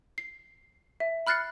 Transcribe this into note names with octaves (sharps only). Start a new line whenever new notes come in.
C7
E5
B5 F6 F#6 A6 C7 C#7